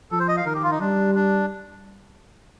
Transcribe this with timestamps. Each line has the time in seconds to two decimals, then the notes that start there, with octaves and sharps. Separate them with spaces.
0.11 F3 A4
0.20 C5
0.28 D#5
0.37 F5
0.45 D#3 A#4
0.55 G4
0.63 F4
0.71 D#4
0.80 G3 D4
1.15 D4